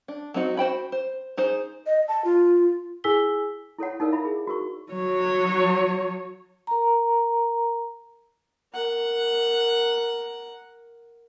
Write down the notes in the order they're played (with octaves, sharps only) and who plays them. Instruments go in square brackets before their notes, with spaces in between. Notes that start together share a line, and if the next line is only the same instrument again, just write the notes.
[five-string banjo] D4
F#3 C4 D#4 F#4
F#4 C5 G5 B5
C5
D#4 G#4 C5
[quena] D#5
A5
F4
[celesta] E4 G#4 G#5 E6 B6 G7
[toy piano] E4 A4 C#5 F#5
D#4 A4 A#4 D5 F5
E4 E5 B5
G#4
F#4 A#4 C#6
[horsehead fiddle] F#3 C#5
[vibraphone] A#4 A#5
[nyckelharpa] A#4 F#5